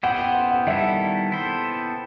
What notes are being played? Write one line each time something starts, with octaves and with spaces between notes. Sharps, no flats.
B3 E4 G4 C5 F#5
G5
F#5
F#5
D#3 G3 B3 E4 A4 E5
B3 E4 A4 C5